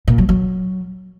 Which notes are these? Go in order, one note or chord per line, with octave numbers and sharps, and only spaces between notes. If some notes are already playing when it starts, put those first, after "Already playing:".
A#2
F#3
F#3